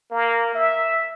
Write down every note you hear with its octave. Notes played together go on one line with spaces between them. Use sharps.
A#3
E5